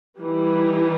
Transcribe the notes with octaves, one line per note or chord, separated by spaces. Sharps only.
E3 G3 D#4